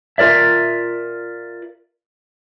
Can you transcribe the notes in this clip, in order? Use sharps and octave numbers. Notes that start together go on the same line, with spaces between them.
F4 A#4 D5 E5